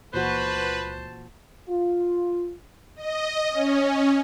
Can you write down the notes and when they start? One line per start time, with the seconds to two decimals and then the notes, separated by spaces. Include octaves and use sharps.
0.14 C#2 A#2 E3 F#4 B4 C5 A5
1.69 F4
2.96 D#5
3.50 C#4